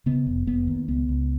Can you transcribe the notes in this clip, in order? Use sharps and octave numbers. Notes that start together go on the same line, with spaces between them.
C#3 B3
F1
F1 B3
D#2
C#2 B3
C#2